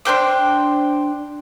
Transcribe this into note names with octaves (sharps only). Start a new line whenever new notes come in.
D4 C5 G5 D6